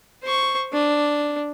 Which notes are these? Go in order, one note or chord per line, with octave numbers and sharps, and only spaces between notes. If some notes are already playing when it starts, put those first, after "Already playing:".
C5 C#6
D4